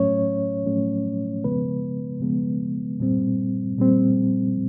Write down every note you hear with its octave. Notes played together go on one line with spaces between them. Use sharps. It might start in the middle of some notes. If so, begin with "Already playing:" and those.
Already playing: A2 F#3 A3 C#4 C#5
A2 F#3 A3 C#4
C#3 F3 G#3 B3 B4
C#3 F3 G#3 B3
A#2 G3 C4
A#2 G3 C4